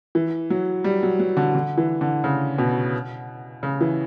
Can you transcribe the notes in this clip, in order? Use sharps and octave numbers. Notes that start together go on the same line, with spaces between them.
E3
F#3
G3
F#3
F#3
D3
D3
E3
D3
C#3
B2
C#3
E3